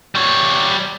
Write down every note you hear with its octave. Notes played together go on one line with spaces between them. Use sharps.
G3 C#5